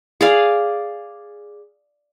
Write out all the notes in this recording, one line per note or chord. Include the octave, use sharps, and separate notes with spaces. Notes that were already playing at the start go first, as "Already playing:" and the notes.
G#4 D5 F5